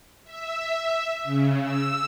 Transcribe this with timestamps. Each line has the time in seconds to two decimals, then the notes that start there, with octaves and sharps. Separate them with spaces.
0.24 E5
1.24 C#3
1.60 E6